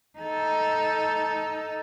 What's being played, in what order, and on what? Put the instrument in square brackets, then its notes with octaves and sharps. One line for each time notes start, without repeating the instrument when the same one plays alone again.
[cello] D#4 A4